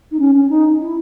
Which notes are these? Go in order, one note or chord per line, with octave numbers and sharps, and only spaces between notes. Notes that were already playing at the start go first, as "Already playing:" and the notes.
D#4
C#4
C#4
D#4
E4